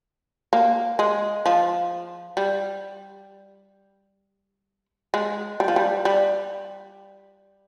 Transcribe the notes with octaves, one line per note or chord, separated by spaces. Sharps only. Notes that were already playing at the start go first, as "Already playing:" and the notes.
A#3
G#3
F3
G3
G#3
G3
F3
G3
G3